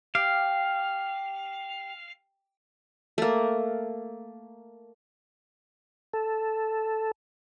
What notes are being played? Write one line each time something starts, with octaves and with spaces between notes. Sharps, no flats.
G4 F5
A3 A#3
A4